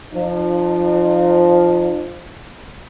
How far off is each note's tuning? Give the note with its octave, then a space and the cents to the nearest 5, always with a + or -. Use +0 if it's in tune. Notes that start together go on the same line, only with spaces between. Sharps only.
F3 +0 D#4 -45